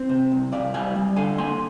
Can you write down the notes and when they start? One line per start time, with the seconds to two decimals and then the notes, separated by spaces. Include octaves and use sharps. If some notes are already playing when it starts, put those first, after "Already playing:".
Already playing: C4
0.09 C3
0.32 C2
0.52 C2 D5 F5
0.74 G3 F5 G#5
0.96 G3
1.16 D3 F5 G#5
1.38 A#3 G#5 C6